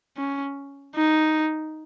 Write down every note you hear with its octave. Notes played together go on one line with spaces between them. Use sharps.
C#4
D#4